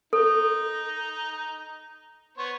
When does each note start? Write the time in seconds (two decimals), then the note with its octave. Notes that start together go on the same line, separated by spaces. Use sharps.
0.13 D#4 A4
2.37 B3 C5 C#5